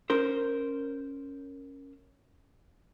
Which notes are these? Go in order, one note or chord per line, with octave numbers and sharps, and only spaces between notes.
C#4 A#4 C5